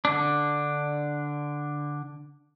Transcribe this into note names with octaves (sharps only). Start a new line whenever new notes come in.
D3 D4